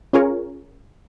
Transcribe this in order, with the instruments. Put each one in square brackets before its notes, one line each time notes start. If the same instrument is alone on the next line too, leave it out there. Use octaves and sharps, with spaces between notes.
[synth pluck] C#4 F4 G#4 A#4 C#5